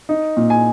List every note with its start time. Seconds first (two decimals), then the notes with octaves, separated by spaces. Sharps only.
0.09 D#4
0.37 A#2
0.50 G#5